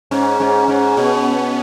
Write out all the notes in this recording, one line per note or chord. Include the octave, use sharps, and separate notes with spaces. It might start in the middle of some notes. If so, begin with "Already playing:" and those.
G#2 C#4
G#2
G#2
B2 B3
C#4